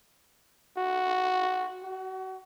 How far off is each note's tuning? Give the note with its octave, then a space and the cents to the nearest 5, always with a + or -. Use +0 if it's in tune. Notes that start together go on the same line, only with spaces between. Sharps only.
F#4 +0
F#4 +30